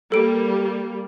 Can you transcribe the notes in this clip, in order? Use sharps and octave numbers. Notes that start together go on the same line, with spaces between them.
G3 A#3 A4 D7